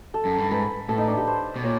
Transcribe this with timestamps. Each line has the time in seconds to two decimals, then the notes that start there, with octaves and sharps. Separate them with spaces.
0.14 A4
0.25 F#2
0.38 G2
0.51 G#2 B4
0.89 A2 A4
0.98 D#4
1.07 D4
1.17 G4
1.27 C5
1.56 B2
1.64 A#2 C#5